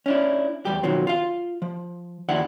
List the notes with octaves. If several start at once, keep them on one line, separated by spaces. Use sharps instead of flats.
C#4 D4 E4
E2 G3 G4
B2 D#3 F3 F#3 C4
F4 F5
F3
D#2 F3 D4 E4 F#5